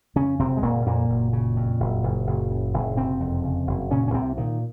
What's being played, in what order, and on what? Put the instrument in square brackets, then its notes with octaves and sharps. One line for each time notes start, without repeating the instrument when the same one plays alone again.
[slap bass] F2 C#3 C#4
F#1 C3 C4
G#3
F#1 A#2 A#3
F2 A#2 A#3
F#1
C#3
F2
F#1
F#1
F#1
C#3
F#1
F#1 C3 C4
F2
C#3
F#1
A#2 C#3 C#4
C#4
C2 C3 C4
A#2 D#3